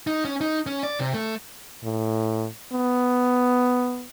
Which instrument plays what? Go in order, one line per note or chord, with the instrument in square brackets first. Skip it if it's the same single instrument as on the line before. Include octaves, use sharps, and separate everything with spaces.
[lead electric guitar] D#4
C#4
D#4
C#4
D5
C3
A3
[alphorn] A2
B3